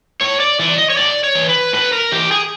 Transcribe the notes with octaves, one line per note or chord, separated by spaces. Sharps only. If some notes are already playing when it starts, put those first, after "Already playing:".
A2 C#5
D5
E3 D5
D#5
C#5
A2 D5
C#5
E3
B4
A2 B4
A#4
E3 G4
G#4